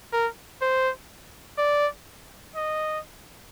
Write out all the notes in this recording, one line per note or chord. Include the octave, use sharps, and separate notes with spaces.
A#4
C5
D5
D#5